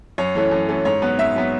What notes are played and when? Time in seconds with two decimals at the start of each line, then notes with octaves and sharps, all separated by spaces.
0.18 F#2 C#5
0.35 E3 A3 C#4
0.51 F#2
0.69 E3 A3 C#4
0.85 G#2 C#5
1.02 F#3 B3
1.18 G#2 E5
1.35 F#3 B3